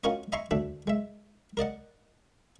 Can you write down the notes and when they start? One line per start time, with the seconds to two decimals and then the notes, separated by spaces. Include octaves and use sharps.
0.04 C#4 F4 F#4 A#4 C#5 D#5
0.32 D#5 E5 G#5 A#5 C6 C#6
0.51 D2 D4 E5
0.87 G#3 E5
1.57 A#4 D5 D#5 F#5